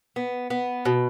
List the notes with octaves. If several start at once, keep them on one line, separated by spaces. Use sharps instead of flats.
B3
B3
B2